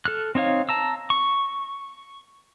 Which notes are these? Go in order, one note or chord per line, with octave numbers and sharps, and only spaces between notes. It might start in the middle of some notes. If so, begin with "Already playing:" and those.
A4 F6 F#6
C4 D#4 C#5 F5
A5 A#5 E6
C#6